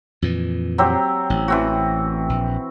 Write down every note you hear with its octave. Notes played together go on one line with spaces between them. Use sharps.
F2 A#2 E3
F#3 C4 G4
A1
E3 C4 F#4
A#1